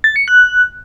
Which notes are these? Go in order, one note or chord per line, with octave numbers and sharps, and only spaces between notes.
A6
C#7
F#6